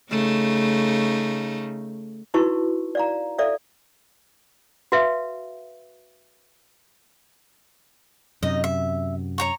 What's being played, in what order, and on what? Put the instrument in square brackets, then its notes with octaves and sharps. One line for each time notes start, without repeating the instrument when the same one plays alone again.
[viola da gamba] C#3 A3 D#4
[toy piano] D#4 E4 F#4 B4 A5 C#6
D5 F5 A#5
A4 D5 E5 F5
F#4 B4 E5 F5
[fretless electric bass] F#2 C3 [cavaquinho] D#4 D#5
[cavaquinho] E5
C#5 A#5 C#6